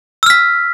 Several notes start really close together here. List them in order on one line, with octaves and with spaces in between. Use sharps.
E6 F6 B6